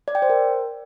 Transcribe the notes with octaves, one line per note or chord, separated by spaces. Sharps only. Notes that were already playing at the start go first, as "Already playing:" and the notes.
D5
G5
C5
A#4